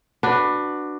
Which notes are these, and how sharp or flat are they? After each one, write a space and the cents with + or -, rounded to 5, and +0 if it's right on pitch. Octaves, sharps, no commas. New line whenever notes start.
D4 +15 F#4 +0 B4 +0